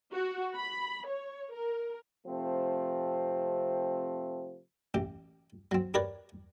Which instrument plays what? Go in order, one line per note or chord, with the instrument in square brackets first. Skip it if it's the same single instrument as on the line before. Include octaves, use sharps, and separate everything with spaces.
[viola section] F#4
B5
C#5
A#4
[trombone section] C3 F3 A3 C4
[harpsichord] A1 G4
F#3 C4
G4 A#4 B4 C#5 D5